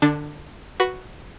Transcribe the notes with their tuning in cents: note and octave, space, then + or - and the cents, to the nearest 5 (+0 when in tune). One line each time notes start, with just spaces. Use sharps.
D3 +25 D4 +0
F#4 +0 B4 +0 C#6 +20